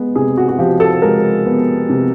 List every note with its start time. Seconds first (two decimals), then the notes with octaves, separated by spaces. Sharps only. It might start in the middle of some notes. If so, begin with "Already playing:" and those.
Already playing: G#3 B3
0.16 C3 G#4
0.38 F#4
0.49 F#4
0.59 F3 G4
0.80 A4
1.02 G#3 A#4
1.46 B3
1.89 C3